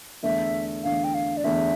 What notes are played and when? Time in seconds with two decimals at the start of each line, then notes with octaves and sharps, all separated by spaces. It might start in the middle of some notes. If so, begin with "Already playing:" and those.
0.23 E2 D3 A3 E5
0.84 E2 D3 A3 F5
1.04 G5
1.14 F5
1.37 D5
1.44 E2 D3 A3 E5